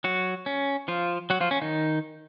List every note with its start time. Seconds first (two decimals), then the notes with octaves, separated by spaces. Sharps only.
0.04 F#3 F#4
0.46 C#4
0.88 F3 F4
1.30 F#3 F#4
1.41 F3 F4
1.51 C#4
1.62 D#3 D#4